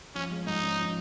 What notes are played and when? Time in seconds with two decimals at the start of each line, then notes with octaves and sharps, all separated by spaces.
0.15 F3 C#4
0.31 G#3
0.47 G#2 D#4
0.63 C#4
0.78 F3